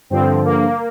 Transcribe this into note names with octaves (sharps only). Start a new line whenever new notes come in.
G2 D3 F3 C4
A#3